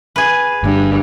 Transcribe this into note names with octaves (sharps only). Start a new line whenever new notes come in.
G#4 B4
G1 G2